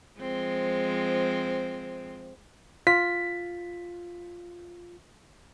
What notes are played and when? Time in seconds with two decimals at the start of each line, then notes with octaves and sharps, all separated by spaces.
0.20 F3 G#3 C4
2.87 F4 B6